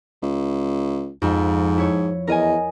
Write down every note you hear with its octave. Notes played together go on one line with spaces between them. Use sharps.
C#2
F2 G#2
E4 C#5
E2 A#4 D#5 G#5